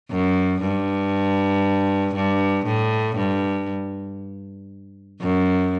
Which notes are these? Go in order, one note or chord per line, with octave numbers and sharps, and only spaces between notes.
F#2
G2
G2
A2
G2
F#2